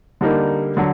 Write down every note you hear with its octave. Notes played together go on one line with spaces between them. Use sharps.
D3 G3 A#3 D#4
D3 F#3